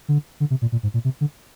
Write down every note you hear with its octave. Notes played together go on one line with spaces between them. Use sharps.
D3
D3
C3
A#2
A#2
G#2
A#2
C3
D3